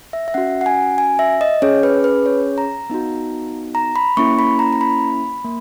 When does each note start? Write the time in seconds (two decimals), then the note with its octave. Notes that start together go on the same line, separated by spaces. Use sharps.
0.13 E5
0.28 E5
0.34 C#4 F#4 F#5
0.61 F#5
0.66 G#5
0.98 G#5
1.19 E5
1.41 D#5
1.62 C#4 G#4 C#5
1.83 B4
2.04 B4
2.26 C#5
2.58 A#5
2.90 B3 D#4 F#4
3.75 A#5
3.96 B5
4.17 A#3 C#4 E4 C#6
4.39 B5
4.59 A#5
4.73 A#5
4.81 B5
5.45 A#3